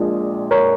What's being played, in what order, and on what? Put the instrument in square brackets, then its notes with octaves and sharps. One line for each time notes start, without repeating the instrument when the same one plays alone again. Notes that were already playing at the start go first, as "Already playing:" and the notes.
Already playing: [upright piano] A#1 A#2 F3 G#3
A#4 C#5